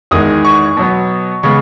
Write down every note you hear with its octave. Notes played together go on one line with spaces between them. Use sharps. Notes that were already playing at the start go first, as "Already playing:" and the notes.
E2 D#3 G#3 D#6
C#6
B2 F#3 B3
C#3 G#3 B3 C#6